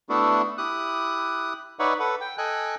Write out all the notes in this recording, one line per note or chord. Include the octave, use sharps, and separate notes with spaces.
A3 B3 D4 E4 F#4 A4
E4 G4 D#6 F#6
D#4 B4 C#5 D5 E5 F#5
A4 B4 F#5
G5
A4 D#5 G5 G#5 F#6